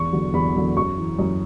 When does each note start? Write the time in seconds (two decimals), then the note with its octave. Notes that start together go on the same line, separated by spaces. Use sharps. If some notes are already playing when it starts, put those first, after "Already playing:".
Already playing: E2 C#6
0.13 D3 F#3
0.33 E2 B5
0.55 D3 F#3
0.76 F#2 C#6
0.97 E3
1.19 F#2